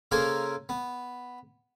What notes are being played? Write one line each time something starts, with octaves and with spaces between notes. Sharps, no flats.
C#3 A#3 A4 A#4 C5 G#5
B3